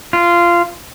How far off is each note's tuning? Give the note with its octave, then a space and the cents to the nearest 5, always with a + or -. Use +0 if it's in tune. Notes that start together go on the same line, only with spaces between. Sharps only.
F4 -15